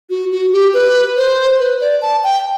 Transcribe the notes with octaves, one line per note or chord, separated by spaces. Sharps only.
F#4
F#4
G4
B4
C5
B4
D5
A5
G5